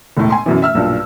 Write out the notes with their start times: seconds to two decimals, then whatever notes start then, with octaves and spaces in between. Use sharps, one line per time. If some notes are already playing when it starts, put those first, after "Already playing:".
0.17 E1 A2
0.30 G#5 C6
0.46 F#2 B2 E3
0.62 E5 E6 F6
0.75 B1 G2 A#2